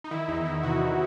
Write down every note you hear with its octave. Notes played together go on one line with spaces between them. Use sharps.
D#4
D#3 E4
E2 D#4
D#3 E4
C3 F#4
E2